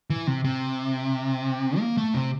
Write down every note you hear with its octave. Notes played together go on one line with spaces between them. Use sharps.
E3
C3
C3
A#3
A3
C3